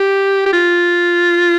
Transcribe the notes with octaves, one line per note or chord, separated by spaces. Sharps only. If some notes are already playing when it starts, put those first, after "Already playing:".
Already playing: G4
G4
F4